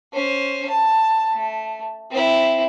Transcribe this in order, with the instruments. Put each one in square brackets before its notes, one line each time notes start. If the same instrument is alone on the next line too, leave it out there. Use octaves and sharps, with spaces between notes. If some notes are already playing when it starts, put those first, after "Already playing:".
[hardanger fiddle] C#4 C5
A5
A3
C4 E4